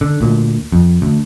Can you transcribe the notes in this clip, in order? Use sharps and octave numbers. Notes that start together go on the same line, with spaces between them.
D3
D2 A#2
F2
D2